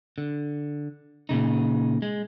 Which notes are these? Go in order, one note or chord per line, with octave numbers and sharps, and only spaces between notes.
D3
A#2 C#3 D#4
G#3